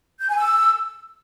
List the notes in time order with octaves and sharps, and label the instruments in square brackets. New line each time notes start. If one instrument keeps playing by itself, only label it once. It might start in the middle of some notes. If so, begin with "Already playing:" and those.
[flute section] G6
G#5
E6